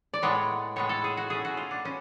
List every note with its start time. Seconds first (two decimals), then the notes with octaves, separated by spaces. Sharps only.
0.14 D5
0.22 A2 G#3 B3 C#5
0.76 A2 G#3 B3 C#5
0.89 A4
1.04 G#4
1.17 F#4
1.30 B2 A3 C#4 G#4
1.45 F#4
1.57 F4
1.71 D4
1.85 B2 C#4